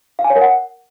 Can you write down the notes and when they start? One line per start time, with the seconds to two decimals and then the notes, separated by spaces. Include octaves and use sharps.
0.19 F5
0.24 G#5
0.30 C#5
0.36 A#4
0.41 F#5